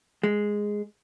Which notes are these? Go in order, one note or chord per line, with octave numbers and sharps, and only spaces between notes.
G#3